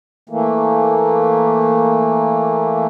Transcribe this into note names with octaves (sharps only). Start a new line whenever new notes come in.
E3 A3 A#3